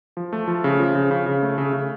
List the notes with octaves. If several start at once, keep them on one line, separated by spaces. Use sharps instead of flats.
F3
A3
F3
C#3
F3
C#3
C#3
C#3
A3
C#3
C#3